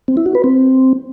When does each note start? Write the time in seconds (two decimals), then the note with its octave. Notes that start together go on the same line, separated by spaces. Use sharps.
0.08 C4
0.17 E4
0.26 F#4
0.35 B4
0.44 C4